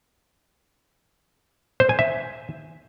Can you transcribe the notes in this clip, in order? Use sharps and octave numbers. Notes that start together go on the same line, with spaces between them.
C5
G#5
E5